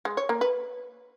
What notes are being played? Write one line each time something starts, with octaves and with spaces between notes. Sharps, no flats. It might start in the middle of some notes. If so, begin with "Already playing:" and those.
G#3
C#5
A#3
B4